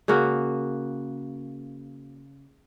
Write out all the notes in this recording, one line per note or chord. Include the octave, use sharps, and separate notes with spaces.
C#3 A#3 F#4